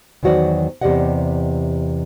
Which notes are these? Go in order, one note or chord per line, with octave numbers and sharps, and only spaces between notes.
E2 D#3 F#3 F#4 C5 D5
E2 C3 G4 D5 D#5 F#5